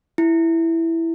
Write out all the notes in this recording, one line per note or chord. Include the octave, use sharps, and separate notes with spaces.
E4